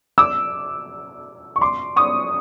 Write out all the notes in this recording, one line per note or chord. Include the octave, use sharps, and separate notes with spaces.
D6 E6
C#6
C6 D6
C#6 D#6